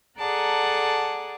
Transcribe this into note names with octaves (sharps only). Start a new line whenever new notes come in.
G#4 A4 D5 F#5 A5 A#5